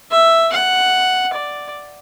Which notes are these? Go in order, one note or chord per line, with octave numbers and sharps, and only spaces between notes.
E5
F#5
D5